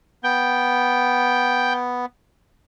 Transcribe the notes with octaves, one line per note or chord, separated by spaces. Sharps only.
B3 G5